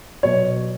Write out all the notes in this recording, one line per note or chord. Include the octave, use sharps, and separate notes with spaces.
B2 F#3 C#5